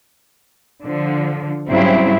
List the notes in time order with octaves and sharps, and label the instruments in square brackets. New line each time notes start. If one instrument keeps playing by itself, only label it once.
[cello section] D3 F3
G#2 C#3 F#3 G3 C4 E4